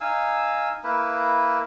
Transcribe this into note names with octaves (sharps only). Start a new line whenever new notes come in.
D#4 F5 G#5 E6
A#3 E4 B4